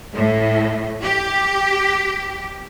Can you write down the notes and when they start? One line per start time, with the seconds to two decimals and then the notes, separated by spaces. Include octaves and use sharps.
0.14 A2
1.02 G4